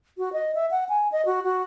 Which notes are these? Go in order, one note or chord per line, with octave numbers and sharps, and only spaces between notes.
F#4
D#5
E5
F#5
G#5
D#5
F#4
F#4